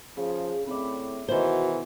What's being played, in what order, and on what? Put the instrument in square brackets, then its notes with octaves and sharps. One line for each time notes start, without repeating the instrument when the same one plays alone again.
[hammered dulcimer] C#3 [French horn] F3 [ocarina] G#4
[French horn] A2 [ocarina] C4 [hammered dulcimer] D5 E5 B5
[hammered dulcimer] B2 [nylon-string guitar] D#3 C5 [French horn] E3 [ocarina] F#4